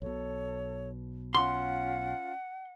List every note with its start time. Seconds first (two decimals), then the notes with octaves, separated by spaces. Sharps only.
0.02 B1 B2 A4 C#5
1.35 C#4 F4 F5 F#5 C6